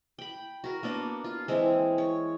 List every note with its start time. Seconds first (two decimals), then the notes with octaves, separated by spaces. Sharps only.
0.18 G5 B5
0.64 F#4 A#4
0.83 A#3 B3 D4
1.24 F4
1.48 E3 G#3 C4
1.98 C#5